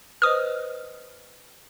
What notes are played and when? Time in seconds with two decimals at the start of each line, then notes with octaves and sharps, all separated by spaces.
0.22 B4 C5 D#5 D#6 F6